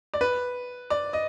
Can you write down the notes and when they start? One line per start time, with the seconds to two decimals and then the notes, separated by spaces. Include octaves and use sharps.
0.14 D5
0.21 B4
0.90 D5
1.13 D#5